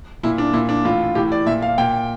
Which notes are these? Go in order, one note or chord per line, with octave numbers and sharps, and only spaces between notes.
A#2 E4
D4
A#2 E4
D4
A2 E3 F4
A2 E3 G4
D5
A#2 E5
F5
A#2 G5